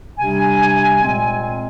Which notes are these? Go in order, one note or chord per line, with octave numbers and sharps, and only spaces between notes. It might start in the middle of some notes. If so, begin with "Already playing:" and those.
C3 G3 D4 G#5
A#2 G#3 C4